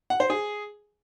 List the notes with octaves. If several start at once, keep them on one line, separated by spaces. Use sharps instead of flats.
F#5
C5
G#4